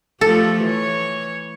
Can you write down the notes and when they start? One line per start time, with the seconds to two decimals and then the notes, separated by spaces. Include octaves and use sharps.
0.21 F3 A3 G4 A4
0.62 E3 C#5